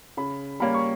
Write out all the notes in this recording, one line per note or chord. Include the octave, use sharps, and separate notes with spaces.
C#3 B5
G3 A#3 C#4 B5
C#6